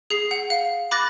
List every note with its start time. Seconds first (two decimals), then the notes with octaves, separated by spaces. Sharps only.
0.10 G#4 C7
0.31 F#5
0.50 F5
0.91 B5 D6 F#6 A6 A#6